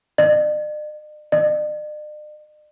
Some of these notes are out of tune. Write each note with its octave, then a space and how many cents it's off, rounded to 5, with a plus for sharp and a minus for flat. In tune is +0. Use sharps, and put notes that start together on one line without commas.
D5 +45
D5 +45